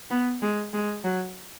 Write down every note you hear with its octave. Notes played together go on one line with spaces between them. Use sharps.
B3
G#3
G#3
F#3